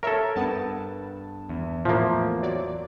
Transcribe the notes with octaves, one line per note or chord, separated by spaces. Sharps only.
A4 A#4 C#5 E5
G2 B3 A5
E2
A2 F3 A3 A#3
F#3 D5